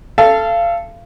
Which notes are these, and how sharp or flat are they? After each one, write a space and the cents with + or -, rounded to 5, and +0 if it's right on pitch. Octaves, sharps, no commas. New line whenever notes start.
A4 +0 F5 -30